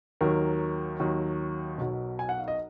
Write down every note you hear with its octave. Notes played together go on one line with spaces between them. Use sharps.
D#2 D#3 F#3 A#4
D#2 D#3 F#3
B1 B2 F#3
G#5
F#5
F5
D#5